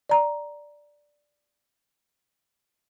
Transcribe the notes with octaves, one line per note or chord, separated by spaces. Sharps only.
D5 A#5